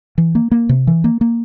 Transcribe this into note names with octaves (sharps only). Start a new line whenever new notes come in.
E3
A#3
A#3
C3
E3
A#3
A#3